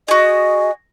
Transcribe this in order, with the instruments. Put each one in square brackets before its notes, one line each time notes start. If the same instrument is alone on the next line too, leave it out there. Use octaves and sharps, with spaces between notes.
[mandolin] F#4 G#4 [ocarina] D#5